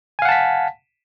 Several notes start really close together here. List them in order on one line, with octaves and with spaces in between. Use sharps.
G#5 F5 F#5 A5 B6